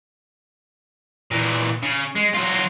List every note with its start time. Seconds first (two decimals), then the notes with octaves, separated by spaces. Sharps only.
1.31 A#2 E3
1.83 C#3
2.16 G#3
2.35 F#3 F4